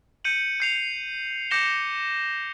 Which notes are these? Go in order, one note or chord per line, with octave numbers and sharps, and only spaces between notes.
G6 C#7 D#7 F#7
G6 C7 F7
D6 G6 A#6 C#7 E7 G7